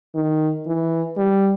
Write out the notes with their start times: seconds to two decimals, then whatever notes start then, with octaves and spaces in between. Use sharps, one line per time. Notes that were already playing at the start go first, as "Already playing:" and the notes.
0.15 D#3
0.67 E3
1.18 G3